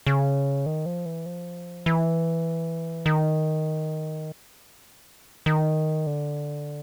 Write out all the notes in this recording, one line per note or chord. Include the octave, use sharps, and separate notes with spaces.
C#3
D#3
F3
E3
F3
E3
D#3
D#3
D3